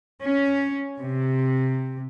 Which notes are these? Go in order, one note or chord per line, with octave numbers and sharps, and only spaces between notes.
C#4
C3